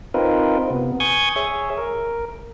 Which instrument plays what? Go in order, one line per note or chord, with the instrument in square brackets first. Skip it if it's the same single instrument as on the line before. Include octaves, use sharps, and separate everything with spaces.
[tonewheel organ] C4 D#4 F4 A#4 B4
C3 B3
G#5 C#6 D#6 G6 G#6
G#4 C#5 E5
A#4